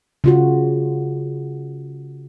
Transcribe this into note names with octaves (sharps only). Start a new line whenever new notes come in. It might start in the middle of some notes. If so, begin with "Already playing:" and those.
C#3 F4 F#4